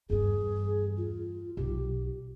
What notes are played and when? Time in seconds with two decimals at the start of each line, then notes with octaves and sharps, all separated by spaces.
0.10 E2 G2 G#4
0.97 F4
1.57 B1 G4